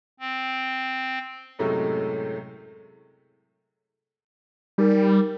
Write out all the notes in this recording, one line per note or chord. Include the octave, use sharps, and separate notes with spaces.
C4
F#2 A2 C3 F#3 G#3 A3
G3 D#4 A#4